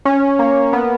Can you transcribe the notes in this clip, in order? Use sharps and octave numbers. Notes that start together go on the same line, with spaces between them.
C#4
A#3
B3